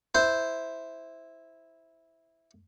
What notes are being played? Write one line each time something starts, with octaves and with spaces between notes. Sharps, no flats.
E4 C5